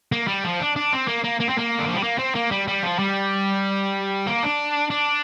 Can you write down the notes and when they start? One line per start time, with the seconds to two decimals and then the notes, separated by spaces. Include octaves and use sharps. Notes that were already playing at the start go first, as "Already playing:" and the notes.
0.12 A#3
0.28 G3
0.44 F3
0.60 D4
0.76 D4
0.93 C4
1.08 A#3
1.24 A#3
1.40 A#3
1.49 C4
1.58 A#3
1.79 D3
1.88 F3
1.95 G3
2.03 A#3
2.19 C4
2.35 A#3
2.51 G3
2.68 G3
2.83 F3
2.99 G3
4.27 A#3
4.43 D4
4.90 D4